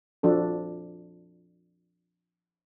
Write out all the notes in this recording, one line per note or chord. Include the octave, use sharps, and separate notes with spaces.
F3 D4 F#4 A4